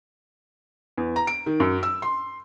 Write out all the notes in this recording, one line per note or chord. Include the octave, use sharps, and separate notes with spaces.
E2
A#5
D7
D#3
F#2
E6
C6